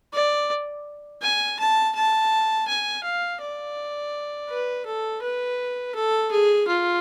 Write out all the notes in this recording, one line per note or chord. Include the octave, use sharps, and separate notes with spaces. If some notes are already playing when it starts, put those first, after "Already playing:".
D5
G#5
A5
A5
G#5
F5
D5
B4
A4
B4
A4
G#4
F4